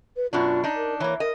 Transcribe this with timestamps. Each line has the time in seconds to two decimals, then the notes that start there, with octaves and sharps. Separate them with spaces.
0.16 B4
0.33 F#2 B2 D4 F4
0.64 D4 D#4
0.76 A#4
1.00 E3 A#3 C#5
1.20 A#4 D#5